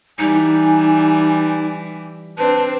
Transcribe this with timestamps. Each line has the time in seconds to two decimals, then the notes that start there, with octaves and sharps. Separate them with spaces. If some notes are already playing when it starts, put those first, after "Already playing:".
0.19 E3 G3 D#4 G#5
2.38 C4 D4 B4 A5